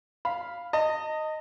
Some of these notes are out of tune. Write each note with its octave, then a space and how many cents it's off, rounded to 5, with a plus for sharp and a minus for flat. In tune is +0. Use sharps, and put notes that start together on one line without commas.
F5 +0 B5 +0
D#5 +0 A5 +45